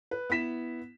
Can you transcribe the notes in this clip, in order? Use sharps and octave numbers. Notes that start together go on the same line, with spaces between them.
B4
B3 E4 B6 E7